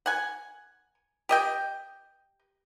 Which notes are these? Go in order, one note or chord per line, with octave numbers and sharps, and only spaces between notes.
F#5 G#5
G4 D#5 G5